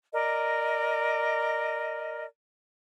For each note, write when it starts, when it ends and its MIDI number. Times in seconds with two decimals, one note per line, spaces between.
0.12 2.24 70
0.12 2.24 74
0.12 2.24 75